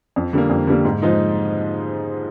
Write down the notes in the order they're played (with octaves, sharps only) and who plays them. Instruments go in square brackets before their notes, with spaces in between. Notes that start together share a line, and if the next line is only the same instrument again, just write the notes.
[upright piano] F2
D3 G3 A#3
F2
D3 G3 A#3
G#2
F3 G#3 D#4